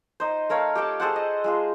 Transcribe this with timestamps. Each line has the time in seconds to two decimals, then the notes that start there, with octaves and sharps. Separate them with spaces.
0.20 D#4 C5
0.49 A3 A#4 C#5 F5
0.75 G4 A4 G5 A5
1.00 G#4 A4 C5 F#5
1.16 D#5
1.44 G#3 F4 G#4